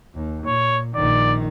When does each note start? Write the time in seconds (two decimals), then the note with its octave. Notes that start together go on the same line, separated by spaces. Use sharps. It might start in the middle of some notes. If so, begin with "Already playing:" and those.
0.15 D#2
0.47 A#2 C#5
0.95 A#1 D#3 D5